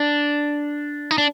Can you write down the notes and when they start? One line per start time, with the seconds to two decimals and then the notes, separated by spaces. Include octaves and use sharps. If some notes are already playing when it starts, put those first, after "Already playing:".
Already playing: D4
1.11 D#4
1.18 D4